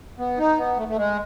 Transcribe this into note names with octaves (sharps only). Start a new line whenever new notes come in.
B3
D#4
B3
A3
A3
G#3